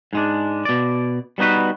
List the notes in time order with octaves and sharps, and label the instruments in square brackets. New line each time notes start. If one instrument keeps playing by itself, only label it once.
[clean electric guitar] G#2 G#3 D4
B2 D5
G3 B3 D#4 F#4 B4